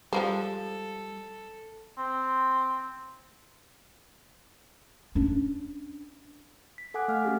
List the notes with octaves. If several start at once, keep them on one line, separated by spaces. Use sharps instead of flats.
F3 G3 G#3 A4 C5
C4
C#4 D4
B6
A4 F#5 G#5 D6 F#6
A3 F5 F#5 F6
A3 C#4 G4 G#4